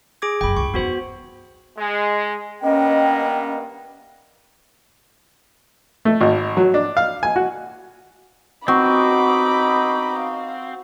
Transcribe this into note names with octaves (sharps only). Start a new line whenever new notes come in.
G#4 D6 G#6
F1 F#2 G5 B5
C#2 G2 C#6
E2 B3 D#4 F#4 C5
G#3
G2 A#3 B3 C#4 D#5 G5
A3
G#1
F#3
D4
F5
G#5
F#4
B3 C4 D#4 F#4 D#5 B5 D6
F5